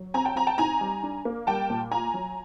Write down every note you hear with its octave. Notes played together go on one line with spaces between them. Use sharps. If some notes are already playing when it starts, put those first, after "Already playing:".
Already playing: F#3
C4 G#5 A#5
G5 A5
C4 G#5 A#5
G5 A5
D#4 G#5 A#5
G3
D4
A#3
G3 G5 A5
A#2
F4 G#5 A#5
F#3